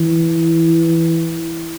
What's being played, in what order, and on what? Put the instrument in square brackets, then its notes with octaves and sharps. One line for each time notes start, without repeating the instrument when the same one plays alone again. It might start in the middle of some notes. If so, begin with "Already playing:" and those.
Already playing: [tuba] E3